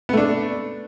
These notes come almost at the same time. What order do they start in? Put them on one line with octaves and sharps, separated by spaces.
B3 A3 D4